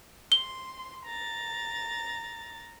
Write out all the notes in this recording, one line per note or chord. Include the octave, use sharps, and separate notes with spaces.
C6 G7
A#5 A6